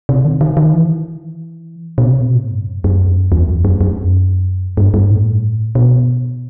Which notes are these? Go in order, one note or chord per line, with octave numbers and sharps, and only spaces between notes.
C3
D#3
D#3
D#3
E3
B2
C3
B2
A2
G2
F#2
F#2
E2
F#2
F#2
F#2
G2
G2
A2
B2